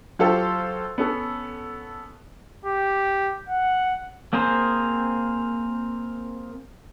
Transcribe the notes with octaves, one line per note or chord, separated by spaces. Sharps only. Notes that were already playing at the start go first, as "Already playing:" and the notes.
F#3 F4 G4 A4 C5
B3 C#4 A4
G4
F#5
A#3 C4 G#4 A#4 C5